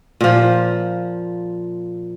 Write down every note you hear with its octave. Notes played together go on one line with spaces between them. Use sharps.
A#2 F3